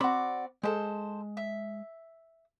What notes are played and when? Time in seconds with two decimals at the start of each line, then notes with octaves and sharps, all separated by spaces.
0.01 C4 F#4 D5 B5
0.63 G#3 A4 C5
1.37 E5